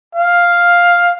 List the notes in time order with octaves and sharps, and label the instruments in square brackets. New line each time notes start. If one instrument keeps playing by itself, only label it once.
[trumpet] F5